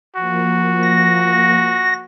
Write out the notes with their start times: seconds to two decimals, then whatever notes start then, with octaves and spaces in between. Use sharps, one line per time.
0.16 F3 A#3 F#4
0.83 A#6